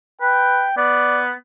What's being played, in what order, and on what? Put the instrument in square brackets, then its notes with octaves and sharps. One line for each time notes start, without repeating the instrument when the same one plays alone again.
[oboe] B4 [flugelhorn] G5
[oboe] B3 [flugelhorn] D5